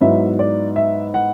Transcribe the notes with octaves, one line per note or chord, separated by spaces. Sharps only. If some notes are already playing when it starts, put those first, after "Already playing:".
G#2 F#3 B3 E4 E5
D5
E5
F#5